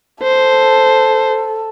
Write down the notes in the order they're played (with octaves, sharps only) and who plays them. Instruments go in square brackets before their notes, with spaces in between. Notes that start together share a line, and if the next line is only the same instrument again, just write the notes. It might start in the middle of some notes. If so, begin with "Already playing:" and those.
[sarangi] A4 [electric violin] C5